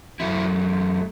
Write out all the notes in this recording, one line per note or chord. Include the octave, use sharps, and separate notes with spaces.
F#2 F#3 A3 E4